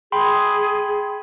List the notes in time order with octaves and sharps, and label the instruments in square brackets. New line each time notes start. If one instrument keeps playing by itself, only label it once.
[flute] G#4 [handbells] G5 B5 C6